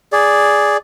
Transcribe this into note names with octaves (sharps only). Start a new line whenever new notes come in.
G#4 D5